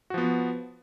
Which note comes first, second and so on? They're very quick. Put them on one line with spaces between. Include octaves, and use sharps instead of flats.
F#4 F3 B3